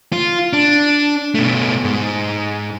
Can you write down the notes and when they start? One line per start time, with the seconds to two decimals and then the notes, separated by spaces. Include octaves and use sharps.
0.12 F4
0.53 D4
1.35 B2 A3
1.84 G#2